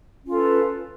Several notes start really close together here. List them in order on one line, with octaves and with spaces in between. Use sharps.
C#4 F4 A4 B4